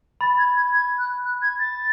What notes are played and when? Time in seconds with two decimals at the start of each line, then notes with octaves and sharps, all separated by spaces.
0.21 B5 A6
0.38 G#6
0.56 G#6
0.73 G#6
0.99 F#6
1.24 F#6
1.42 G#6
1.59 A6